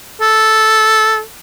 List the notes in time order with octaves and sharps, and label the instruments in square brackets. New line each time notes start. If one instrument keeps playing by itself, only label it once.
[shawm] A4